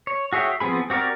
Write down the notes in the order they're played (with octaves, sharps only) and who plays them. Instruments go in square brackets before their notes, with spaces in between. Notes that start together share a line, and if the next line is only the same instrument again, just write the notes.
[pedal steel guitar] C#5
F#4 G#4 C#5 E5 G5
F3 B3 C4 G#4 B5
C4 F#4 G4 A#4 D5